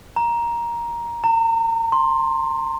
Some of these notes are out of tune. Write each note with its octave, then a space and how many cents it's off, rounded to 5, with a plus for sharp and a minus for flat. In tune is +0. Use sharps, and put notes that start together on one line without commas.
A#5 +10
A#5 -35
C6 +15